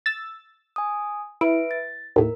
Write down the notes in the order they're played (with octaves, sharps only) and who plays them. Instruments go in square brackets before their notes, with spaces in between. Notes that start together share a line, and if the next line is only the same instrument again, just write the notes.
[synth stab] E6 A6
[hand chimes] G#5 D#6
[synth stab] E4 [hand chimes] B4 E5 D7
[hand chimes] A6
[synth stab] D#2 A2 [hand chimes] A#4